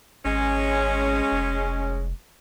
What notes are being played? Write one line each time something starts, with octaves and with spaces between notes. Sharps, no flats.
G#1 G#3 C#4
F1